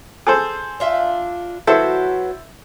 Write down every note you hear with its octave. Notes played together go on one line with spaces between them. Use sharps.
G#4 A4 C5
D4 F4 E5
F#3 E4 F#4 A4 B4 C5